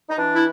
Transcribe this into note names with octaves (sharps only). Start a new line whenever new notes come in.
D#4
E3 D4
E4